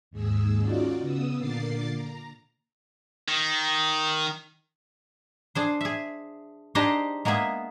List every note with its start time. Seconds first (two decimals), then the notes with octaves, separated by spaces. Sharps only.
0.11 D#2 G#2 G#4 E6
0.59 C#4 D#4 F4 F#4 D5
1.00 C#3 B3 D#6 E6
1.38 A#2 D3 A#3 D6 A6 C7
1.94 A#5
3.28 D#3
5.55 D4 G#4 C5
5.81 G#4 E5
6.75 D4 D#4 G4 G#4 C5 D#5
7.25 G#3 A#3 B3 G#4 E5